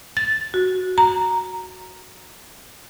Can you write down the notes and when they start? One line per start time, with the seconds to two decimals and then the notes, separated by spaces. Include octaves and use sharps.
0.17 A6
0.54 F#4
0.98 A#5